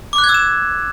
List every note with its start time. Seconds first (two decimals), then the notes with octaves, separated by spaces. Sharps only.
0.13 D6
0.18 F#6
0.24 G#6
0.29 E6
0.34 E7